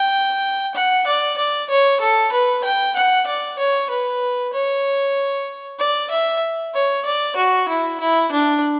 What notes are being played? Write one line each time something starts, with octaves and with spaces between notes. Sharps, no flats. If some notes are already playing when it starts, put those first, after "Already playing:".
Already playing: G5
F#5
D5
D5
C#5
A4
B4
G5
F#5
D5
C#5
B4
C#5
D5
E5
C#5
D5
F#4
E4
E4
D4